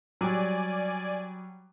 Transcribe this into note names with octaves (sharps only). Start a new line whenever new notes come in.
F#3 G3 D5 G#5